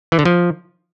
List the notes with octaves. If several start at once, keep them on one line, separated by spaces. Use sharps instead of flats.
E3
D3
F3